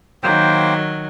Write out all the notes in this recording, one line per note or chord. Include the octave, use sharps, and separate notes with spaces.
D#3 F#3 A#3 C5 G5